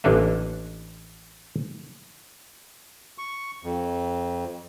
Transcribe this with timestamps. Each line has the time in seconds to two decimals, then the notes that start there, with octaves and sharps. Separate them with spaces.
0.04 A1 A#3 D4 A4 B4 E5
3.18 C#6
3.63 F2